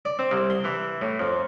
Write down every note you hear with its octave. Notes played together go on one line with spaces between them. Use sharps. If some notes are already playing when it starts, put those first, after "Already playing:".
D5
C4
C2
C6
E3
A2
F2